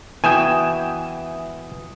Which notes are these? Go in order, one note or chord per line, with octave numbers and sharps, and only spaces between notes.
E3 B3 F#4 E5 G5 G#5 D#6 E7